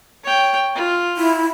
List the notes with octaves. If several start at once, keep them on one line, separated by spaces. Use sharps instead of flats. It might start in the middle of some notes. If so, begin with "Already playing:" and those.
C#5 G5
F4
E4